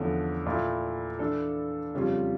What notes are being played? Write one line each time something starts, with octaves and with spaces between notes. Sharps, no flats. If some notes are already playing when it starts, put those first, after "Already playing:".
Already playing: E2 D3 F3 A3 C#4
A#2 A3 E4
E3 A3 D4 A4
F2 C#3 G3 C#4 F4